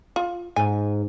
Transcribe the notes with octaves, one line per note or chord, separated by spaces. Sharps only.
F4
G#2 G#5